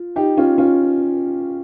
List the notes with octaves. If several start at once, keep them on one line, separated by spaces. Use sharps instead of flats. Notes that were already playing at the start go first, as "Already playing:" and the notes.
Already playing: F4
D#4 G4
C#4 F4
C#4 F4